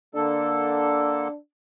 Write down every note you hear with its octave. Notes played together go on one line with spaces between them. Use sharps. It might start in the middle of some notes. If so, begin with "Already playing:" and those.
D3 A#3 D4 A4